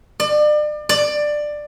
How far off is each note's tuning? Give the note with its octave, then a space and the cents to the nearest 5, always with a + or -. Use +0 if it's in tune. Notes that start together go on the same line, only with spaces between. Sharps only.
D5 +35
D5 +15